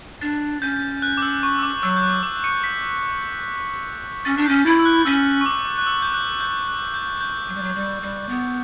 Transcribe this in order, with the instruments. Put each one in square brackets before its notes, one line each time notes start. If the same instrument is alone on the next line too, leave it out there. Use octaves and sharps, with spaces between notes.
[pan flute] D4 [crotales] A6
[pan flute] C#4 [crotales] G6
[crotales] F#6
D6
E6
C#6
E6
D6
[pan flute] F#3 [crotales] E6
[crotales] G6
F#6
D6
C#6 C#7
B6
[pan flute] C#4 [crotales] A6
[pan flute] D4
[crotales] G6
[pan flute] C#4
[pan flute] E4 [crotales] A6
[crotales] E6
F#6
[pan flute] C#4 [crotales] E6
[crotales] C#6
D6
F#6
E6
G6
F#6
G6
F#6
G6
G6
[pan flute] F#3
G3
F#3
G3
G3
B3